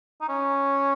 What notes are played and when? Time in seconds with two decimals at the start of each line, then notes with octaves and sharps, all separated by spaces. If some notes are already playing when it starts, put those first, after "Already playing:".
0.21 D#4
0.29 C#4